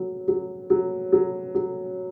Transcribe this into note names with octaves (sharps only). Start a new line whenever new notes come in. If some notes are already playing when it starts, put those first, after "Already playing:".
Already playing: F#3
F#3
F#3
F#3
F#3